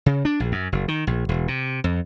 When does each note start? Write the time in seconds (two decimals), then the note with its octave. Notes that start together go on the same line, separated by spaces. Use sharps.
0.06 C#3
0.25 D4
0.40 A#1
0.52 F#2
0.72 F#1
0.88 D#3
1.07 A#1
1.29 E1
1.48 C3
1.84 F2